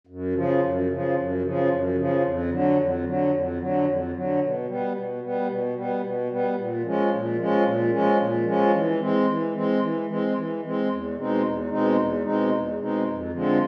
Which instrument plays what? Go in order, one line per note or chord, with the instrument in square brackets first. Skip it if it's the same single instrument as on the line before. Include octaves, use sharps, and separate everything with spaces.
[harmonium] F#2
C#3 F3
F#2
C#3 F3
F#2
C#3 F3
F#2
C#3 F3
F2
D3 F#3
F2
D3 F#3
F2
D3 F#3
F2
D3 F#3
B2
G3 B3
B2
G3 B3
B2
G3 B3
B2
G3 B3
A#2
F3 G#3 C#4
A#2
F3 G#3 C#4
A#2
F3 G#3 C#4
A#2
F3 G#3 C#4
E3
G#3 C4
E3
G#3 C4
E3
G#3 C4
E3
G#3 C4
E2
B2 G#3 C4 D#4
E2
B2 G#3 C4 D#4
E2
B2 G#3 C4 D#4
E2
B2 G#3 C4 D#4
F2
D3 F3 G#3 C4